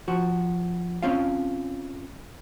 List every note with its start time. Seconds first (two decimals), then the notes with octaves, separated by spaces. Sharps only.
0.08 F3 F#4
1.03 C4 C#4 F4 F5